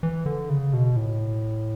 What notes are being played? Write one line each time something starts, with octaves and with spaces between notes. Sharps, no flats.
E3
D3
C#3
B2
A2